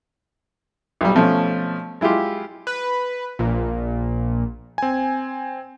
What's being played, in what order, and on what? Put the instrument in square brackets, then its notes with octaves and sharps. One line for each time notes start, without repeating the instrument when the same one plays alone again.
[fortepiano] B1 G3
B2 F3 A3 C#4
G#3 E4 F4 G4
[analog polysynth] B4
A#1 A#2
[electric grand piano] C4 G#5